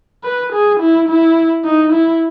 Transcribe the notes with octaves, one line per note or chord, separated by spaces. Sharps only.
B4
G#4
E4
E4
D#4
E4